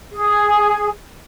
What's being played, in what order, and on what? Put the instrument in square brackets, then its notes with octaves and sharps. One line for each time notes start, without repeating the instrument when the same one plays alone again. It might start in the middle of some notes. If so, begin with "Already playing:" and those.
[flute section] G#4